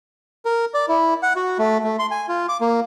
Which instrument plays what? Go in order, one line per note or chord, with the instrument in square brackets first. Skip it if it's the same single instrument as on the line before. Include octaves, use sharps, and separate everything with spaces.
[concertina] A#4
D5
E4
F#5
F#4
A3
A3
C6
G#5
F4
D6
A#3